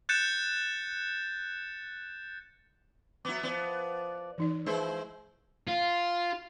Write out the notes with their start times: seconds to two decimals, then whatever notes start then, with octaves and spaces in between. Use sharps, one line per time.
0.09 F#6 G6 A6 C#7 E7
3.25 F#3 B3 E4 D6
3.43 F3 B3 D5
4.38 E3 D#4 D5
4.66 F3 G#3 E4 B4 C5
5.68 F4